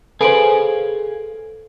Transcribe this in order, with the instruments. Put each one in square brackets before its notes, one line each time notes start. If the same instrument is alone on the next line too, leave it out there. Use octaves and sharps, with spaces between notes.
[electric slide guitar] G#4 F5 G#5 [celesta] A4 D7 F#7 [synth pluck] B4 C5